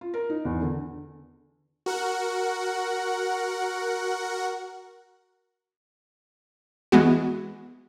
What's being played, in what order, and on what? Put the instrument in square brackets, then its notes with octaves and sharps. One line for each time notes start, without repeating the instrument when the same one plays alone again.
[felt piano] F4
A#4
D#4
E2
D3
[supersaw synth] F#4 A#4 F#5
[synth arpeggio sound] E3 G#3 B3 F#4